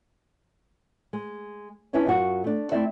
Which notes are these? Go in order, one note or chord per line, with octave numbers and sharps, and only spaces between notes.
G#3
C#4 D4 E4 B4 C#5 D#5
F#2 D#4 F4 F#4
A3 D4
A3 C4 E4 D5 E5